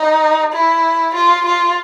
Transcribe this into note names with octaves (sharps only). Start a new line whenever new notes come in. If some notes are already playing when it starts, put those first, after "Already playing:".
Already playing: D#4
E4
F4
F4